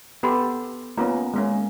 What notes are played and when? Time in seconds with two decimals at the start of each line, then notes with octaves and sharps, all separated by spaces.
0.23 B3 G4 A4 F#5 B5 C6
0.98 A#3 B3 C#4 F4 A#5
1.34 G#3 A#3 C#4